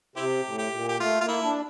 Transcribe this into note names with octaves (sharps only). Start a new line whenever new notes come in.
C3 C4 E4 G4
A2
G4
A#2
G4
A3 F4
A#3 F4
E4
D4